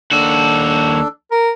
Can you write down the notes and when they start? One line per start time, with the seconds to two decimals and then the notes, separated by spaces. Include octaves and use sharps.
0.12 D#2 D4 F#4 A4
1.31 A#4